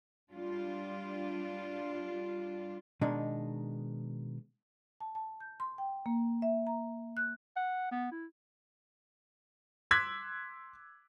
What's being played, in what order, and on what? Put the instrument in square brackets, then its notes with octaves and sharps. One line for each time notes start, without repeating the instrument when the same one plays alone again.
[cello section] G3 D4 F4
[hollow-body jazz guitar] B2 D#3 G#3 D4 D#4
[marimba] A5
A5
G6
C6
G5
A#3
E5
A#5
F#6
[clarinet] F#5
B3
E4
[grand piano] C6 D6 E6 F#6 G#6 B6